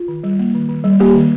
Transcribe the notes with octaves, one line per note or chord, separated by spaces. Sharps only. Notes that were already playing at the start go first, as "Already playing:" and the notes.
Already playing: F4
D#3
G3
A#3
D#3
D#3
G3
A#3 G4
D#3